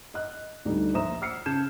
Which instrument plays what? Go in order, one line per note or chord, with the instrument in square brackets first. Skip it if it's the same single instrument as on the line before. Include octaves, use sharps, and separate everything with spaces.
[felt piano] D#5 F#6
D2 G3 D#4
A#1 C5 E5 A#5 D#6 E7
E6 F6 C7 C#7
C#3 A5 G6 G#6 E7